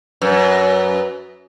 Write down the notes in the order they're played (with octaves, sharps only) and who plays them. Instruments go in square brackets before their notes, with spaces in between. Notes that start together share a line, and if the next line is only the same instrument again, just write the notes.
[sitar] F#2 [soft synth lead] B4